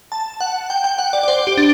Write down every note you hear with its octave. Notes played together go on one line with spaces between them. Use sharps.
A5
F#5
G5
G5
F#5
D5
D5
C5
G4
D4